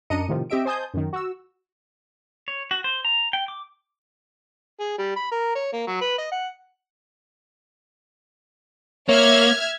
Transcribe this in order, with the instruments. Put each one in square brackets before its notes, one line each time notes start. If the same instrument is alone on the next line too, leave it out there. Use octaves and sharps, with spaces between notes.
[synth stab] F#2 D4 D#5 A#5 C#7 D#7
A2 C3 D#3 F3
C4 G4 D#5 E5 D7
C5 D#5 G#5 A5 D#6 G6
F#2 D#3
F#4 E6
[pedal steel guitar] C#5
F#4
C5
A#5
G5
D6
[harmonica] G#4
G3
B5
A#4
C#5
A#3
F#3
B4
D#5
F#5
[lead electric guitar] A#3 [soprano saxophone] C#5 [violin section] E5 F6 G#6